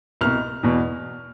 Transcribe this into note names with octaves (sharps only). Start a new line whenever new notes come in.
C2 B2 F6
E2 B2